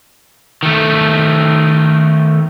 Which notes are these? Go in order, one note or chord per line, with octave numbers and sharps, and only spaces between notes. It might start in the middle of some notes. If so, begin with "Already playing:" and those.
D#3 A3